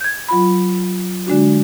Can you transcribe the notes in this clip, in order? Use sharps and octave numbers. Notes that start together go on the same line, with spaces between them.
G6 G#6
F#3 F4 B5
D3 G#3 D4 F#4